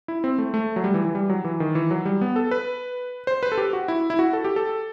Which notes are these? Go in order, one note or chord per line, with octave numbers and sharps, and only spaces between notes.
E4
C4
A3
A3
F#3
G3
E3
E3
G3
F#3
E3
D#3
E3
F#3
G3
B3
A4
B4
C5
B4
A4
G4
F#4
E4
E4
F#4
A4
G4
A4